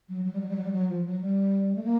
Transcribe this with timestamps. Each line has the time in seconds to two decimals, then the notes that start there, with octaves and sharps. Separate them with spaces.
0.09 F#3
0.25 F#3
0.33 G3
0.41 F#3
0.49 G3
0.56 F#3
0.64 G3
0.72 F#3
0.89 F3
1.05 F#3
1.21 G3
1.76 A3
1.84 A#3